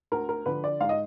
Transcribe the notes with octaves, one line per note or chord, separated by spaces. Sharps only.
D2 A#4
A#4
D3 F3 B4
D5
G#2 F5
D#5